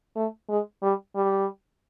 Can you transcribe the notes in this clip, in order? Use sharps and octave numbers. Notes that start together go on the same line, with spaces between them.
A3
G#3
G3
G3